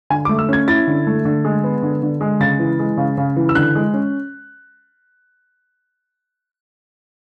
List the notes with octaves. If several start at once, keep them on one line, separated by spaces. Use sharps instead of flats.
D3 G#5
D6
A3
E6
C#4 G#6
E4 A6
D3
A3
D3
G#3
B3
D3
D3
G#3
C#3 A6
E3
G#3
C#3
C#3
E3
E6
D3 F#6
G#3
C#4